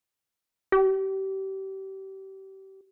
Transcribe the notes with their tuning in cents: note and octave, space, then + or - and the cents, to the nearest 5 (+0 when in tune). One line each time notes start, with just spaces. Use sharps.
G4 -30